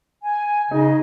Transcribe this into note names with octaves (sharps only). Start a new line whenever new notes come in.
G#5
C#3 D#4 D#5